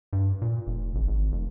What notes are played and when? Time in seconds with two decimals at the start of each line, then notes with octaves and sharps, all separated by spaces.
0.13 G2
0.42 A#2
0.67 F1
0.95 G#1
1.08 G#1
1.32 F1